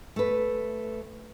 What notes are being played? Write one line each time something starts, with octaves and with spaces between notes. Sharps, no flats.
A3 B4